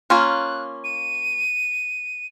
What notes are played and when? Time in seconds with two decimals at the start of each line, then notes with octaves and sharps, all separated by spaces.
0.10 A#3 C#4 F4 F#6
0.84 D#7